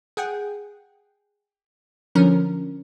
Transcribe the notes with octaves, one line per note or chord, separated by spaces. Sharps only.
G#4 F#5 G5
D3 F3 C#4 A#4